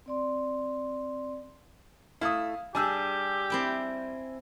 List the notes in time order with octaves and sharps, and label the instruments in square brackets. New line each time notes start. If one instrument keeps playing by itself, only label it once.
[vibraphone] C4 D5 C6
[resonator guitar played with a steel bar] A3 E4 [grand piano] F5 D#6
[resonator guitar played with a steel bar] G3 D4 G#4 [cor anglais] G4 [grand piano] G#5 E6
[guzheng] C4 E4 G5